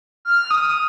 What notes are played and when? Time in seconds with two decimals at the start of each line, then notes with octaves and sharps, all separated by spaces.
0.25 F6
0.51 D#6
0.69 D#6